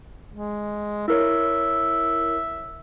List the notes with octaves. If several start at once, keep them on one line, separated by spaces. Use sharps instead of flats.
G#3
E4 A#4 C#5 E5